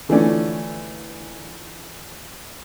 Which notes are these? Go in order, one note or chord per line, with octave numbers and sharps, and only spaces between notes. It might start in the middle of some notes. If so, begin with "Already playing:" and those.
D3 E3 F3 A3 C#4 D5